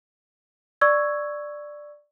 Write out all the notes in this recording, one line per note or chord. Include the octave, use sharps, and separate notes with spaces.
D5 C#6 E6 G#6